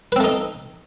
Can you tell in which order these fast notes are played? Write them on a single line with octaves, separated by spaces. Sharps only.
B4 C4 A3 D#4